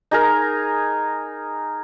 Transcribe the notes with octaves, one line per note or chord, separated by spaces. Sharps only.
D#4 G#4 A#4